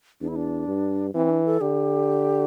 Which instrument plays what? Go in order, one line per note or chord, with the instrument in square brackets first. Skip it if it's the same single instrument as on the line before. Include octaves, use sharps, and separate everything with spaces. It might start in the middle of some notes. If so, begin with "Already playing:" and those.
[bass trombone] E2 [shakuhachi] D4
[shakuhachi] E4
D4
[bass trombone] G2
[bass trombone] E3 [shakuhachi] C4
[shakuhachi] D4
A4
[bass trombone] D3 [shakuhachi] G4